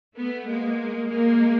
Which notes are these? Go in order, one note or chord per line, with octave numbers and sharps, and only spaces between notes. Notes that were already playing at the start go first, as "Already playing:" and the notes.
A3 B3
G#3 A#3
G#3 A#3